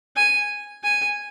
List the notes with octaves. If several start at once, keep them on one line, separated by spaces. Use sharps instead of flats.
G#5
G#5